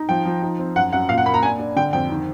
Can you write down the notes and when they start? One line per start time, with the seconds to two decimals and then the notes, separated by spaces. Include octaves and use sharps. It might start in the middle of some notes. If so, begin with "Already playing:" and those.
Already playing: D#4
0.09 F3 G5
0.25 F3
0.42 D#4
0.59 C4
0.76 F#2 F#5
0.93 F#2 F#5
1.09 A#2 F5
1.18 F#5
1.26 A#3 B5
1.34 A#5
1.43 D4 G#5
1.59 D4
1.76 D3 G5
1.93 F2 G5
2.10 D#3